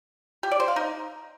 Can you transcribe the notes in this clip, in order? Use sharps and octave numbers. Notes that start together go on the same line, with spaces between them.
G4
D5
C5
F5
D#4